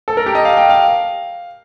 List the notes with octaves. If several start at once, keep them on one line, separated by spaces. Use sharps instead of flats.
A4
A#4
G4
D#5
F5
G5
F5